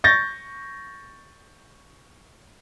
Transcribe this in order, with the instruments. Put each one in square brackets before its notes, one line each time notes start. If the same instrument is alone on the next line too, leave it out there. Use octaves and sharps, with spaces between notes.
[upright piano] C#6 G6 A6 A#6